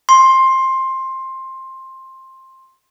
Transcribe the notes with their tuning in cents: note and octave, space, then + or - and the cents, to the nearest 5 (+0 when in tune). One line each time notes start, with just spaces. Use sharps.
C6 +15